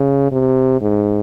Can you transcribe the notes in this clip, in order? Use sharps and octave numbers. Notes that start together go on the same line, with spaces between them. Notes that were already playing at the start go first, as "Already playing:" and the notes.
Already playing: C#3
C3
G#2